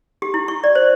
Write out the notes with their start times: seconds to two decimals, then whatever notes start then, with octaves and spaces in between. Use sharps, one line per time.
0.22 G4
0.34 E4
0.48 C#6
0.64 D5
0.75 C5